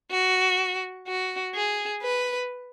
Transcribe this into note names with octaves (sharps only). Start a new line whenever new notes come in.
F#4
F#4
G#4
B4